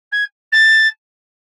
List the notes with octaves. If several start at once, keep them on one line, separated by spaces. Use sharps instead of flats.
G#6
A6